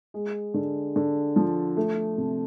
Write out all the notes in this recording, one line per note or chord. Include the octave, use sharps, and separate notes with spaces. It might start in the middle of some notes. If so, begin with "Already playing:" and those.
G#3
D3
D3
F3
A3
C3